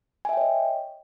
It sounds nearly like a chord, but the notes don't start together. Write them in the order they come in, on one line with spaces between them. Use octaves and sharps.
G#5 E5 G5 C#5 D#5